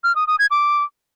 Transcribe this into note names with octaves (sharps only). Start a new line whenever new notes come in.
F6
D#6
D#6
G#6
D6